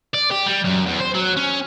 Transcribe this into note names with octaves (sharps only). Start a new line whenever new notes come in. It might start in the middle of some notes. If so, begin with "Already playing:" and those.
D5
G4
G3
F#2
E2
C5
F#3
C#4